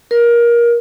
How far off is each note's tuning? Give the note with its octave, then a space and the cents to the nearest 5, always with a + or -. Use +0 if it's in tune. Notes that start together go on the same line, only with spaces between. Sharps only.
A#4 +20